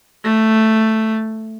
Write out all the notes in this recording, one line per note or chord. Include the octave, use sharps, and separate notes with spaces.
A3